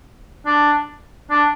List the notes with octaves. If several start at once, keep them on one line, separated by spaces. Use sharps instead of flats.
D4
D4